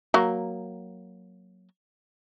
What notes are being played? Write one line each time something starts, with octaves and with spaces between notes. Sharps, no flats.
F#3 A#3